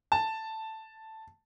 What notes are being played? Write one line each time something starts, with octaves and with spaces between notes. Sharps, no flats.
A5